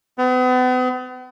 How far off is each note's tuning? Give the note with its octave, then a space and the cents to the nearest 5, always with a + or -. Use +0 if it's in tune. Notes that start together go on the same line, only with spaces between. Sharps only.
B3 +40